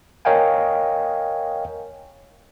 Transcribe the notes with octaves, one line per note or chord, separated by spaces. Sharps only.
A#4 C#5 D#5 F5 G5 G#5